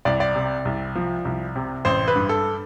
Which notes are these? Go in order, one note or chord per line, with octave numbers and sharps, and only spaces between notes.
C2 D5
D5
C3
C2
F3
C2
C3
A1 C5
B4
G2
A4